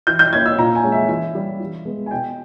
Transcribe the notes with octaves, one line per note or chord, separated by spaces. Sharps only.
E3 G6
G6
A#3 C#4 G#6
E6
A#2 A#5
G#5
G#3 C#4
E5
E3 E5
G3 C#4
E3
G#3 B3
G#5
B2 G5